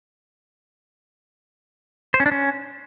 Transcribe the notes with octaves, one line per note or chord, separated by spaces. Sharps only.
C5
C#4
D4
C#4